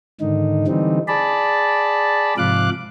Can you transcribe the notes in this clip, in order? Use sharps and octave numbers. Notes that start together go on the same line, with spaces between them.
G#2 D3 D#3 D#4
D3 E3 G3 C4 D#4
G#4 D5 A5 B5
G#2 C3 F3 F5 D6 F#6